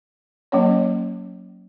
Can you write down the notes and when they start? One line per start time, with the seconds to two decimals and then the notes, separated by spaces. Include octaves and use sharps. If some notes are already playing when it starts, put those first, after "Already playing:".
0.52 F#3 A#3 C#4 C#5